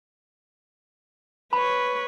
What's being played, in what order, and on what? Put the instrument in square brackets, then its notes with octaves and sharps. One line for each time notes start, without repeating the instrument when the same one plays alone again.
[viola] B4 C#5 [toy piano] B5